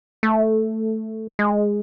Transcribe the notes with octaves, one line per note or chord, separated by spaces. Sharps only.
A3
G#3